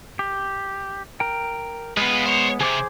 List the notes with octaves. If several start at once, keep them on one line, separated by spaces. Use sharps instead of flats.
G4
A#4 G5
G#3 B3 F4 B4
C5 C#5
D2 C3 G#4 C5 D6